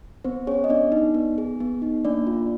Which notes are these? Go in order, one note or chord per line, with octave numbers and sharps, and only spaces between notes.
B3 C4 C5
C#4 G#4 C#5
D#5
B3 D4 D5
D#4
B3
G#4
B3
D#4
A#3 D4 D5
F4